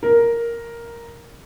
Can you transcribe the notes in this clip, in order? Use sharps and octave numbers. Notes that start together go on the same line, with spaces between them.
A#4